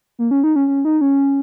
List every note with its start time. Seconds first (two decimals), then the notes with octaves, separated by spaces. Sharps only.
0.19 A#3
0.31 C#4
0.44 D#4
0.56 C#4
0.68 C#4
0.85 D#4
1.01 C#4